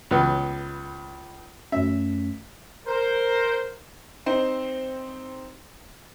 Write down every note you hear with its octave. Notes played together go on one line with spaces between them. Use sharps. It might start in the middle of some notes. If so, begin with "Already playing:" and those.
C#2 B3
F#2 A3 C#4 E5
A#4 C5
C4 D#4 C5